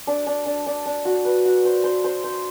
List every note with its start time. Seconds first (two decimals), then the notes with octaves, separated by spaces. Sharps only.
0.07 D4
0.27 D4
0.46 D4
0.66 D4
0.86 D4
1.05 F#4
1.25 B4
1.45 F#4
1.65 C5
1.84 C5
2.04 C5
2.24 C5